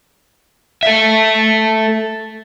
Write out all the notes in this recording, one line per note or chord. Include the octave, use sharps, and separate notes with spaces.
A4 E5